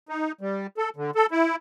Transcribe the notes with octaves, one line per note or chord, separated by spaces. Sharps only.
D#4
G3
A4
D3
A4
E4